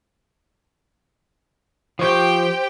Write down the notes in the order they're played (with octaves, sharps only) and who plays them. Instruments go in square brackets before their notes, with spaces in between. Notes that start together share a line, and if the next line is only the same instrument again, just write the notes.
[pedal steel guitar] F3 C#6 [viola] G4 G5 [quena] C5